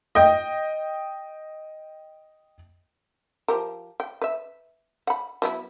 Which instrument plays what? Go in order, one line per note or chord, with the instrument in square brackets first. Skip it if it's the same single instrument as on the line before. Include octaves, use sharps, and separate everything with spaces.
[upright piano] D#5 G5
[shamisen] F3 G4 A#4
G5
B4 E5
F#5 B5
F#3 B3 E4